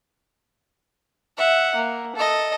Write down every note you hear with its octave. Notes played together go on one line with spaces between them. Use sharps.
E5 F#5
A#3
A4 D#5